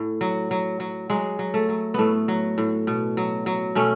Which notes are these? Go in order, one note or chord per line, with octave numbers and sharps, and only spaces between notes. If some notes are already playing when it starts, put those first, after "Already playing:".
Already playing: A2
F#3
F#3
F#3
F#3 G#3
F#3
A3
F#3
A2 A3 B3
F#3
A2
B2
F#3
F#3
B2 A3 C#4